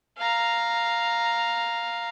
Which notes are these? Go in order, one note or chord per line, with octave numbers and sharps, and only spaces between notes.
F5 A#5